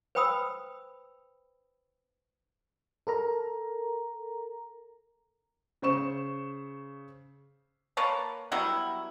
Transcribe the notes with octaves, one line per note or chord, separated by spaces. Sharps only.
B4 C5 G5 B5 D#6 E6
A4 A#4 A#5
C#3 C5 C#6 E7
A#3 B4 C#5 A5
F#3 G3 B3 E4